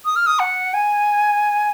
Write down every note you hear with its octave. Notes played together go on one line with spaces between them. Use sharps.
D#6
F6
D#6
F#5
G#5